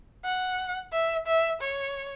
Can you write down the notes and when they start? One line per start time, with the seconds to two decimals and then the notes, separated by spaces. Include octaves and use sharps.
0.24 F#5
0.92 E5
1.27 E5
1.61 C#5